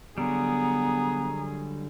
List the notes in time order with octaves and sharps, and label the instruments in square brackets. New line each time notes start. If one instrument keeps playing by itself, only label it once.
[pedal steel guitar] D3 F#3 G3 [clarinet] B3 [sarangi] G#4 [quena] A#5